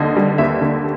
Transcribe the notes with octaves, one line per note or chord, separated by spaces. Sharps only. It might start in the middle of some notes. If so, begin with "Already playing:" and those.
Already playing: D#2 D3 D#5
G3
D#2 E5
D3